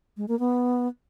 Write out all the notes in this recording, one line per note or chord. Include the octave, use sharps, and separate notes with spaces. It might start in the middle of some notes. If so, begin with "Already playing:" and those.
G#3
A#3
B3